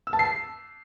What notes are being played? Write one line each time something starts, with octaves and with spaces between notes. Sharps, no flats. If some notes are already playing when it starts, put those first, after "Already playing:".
E6
A5
C7